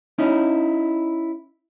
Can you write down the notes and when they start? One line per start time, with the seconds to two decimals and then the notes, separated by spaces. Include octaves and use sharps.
0.18 C#4 D#4 E4